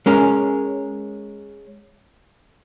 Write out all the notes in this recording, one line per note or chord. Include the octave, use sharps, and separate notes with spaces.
G#3 C#4 A#4